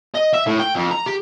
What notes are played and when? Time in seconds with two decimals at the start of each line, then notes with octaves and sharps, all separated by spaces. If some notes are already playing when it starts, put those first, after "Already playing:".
0.15 D#5
0.34 E5
0.47 A2
0.60 G5
0.75 F2
0.91 A#5
1.06 G4